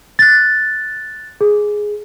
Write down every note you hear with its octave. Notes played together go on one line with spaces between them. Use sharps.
F#6 A6
G#4